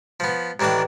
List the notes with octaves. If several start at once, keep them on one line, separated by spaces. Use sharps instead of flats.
F3 B3
A1 D#3 E3 D4 A5